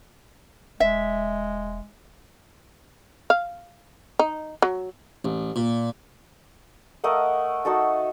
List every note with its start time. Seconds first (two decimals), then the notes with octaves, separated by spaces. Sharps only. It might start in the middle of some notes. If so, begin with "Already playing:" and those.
0.80 E1 G#3 E5
3.30 F5
4.19 D#4
4.62 F#3
5.25 A1
5.56 A#2
7.04 A3 A#4 D#5 F#5
7.65 D#4 F#4 A4 A5